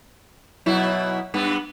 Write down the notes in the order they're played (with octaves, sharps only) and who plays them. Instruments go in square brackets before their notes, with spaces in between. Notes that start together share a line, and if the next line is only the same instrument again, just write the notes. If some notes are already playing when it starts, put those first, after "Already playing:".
[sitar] B2 F#3 E4
G2 B3